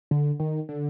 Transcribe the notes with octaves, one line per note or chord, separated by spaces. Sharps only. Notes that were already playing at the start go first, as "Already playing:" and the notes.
D3
D#3
D3